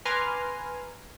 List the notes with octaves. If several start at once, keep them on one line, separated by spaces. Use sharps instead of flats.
B4 G#5 A#5 C6 D6 F6